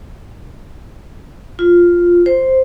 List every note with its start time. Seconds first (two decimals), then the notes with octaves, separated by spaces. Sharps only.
1.59 F4
2.26 C5